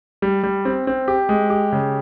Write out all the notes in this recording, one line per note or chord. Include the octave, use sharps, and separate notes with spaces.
G3
G3
C4
C4
G4
G#3
G4
C#3